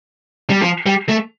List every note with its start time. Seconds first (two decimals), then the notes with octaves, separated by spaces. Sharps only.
0.50 G3
0.62 F3
0.86 G3
1.09 A3